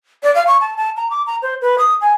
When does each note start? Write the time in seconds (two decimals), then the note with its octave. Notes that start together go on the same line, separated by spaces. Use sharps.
0.23 D5
0.35 F5
0.47 C#6
0.61 A5
0.77 A5
0.97 A#5
1.11 D6
1.26 A#5
1.42 C5
1.62 B4
1.78 D#6
2.01 G#5